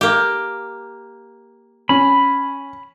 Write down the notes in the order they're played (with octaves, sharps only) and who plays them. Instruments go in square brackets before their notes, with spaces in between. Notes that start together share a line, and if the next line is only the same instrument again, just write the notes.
[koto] A#3 G4
[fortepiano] C#4 [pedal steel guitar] B5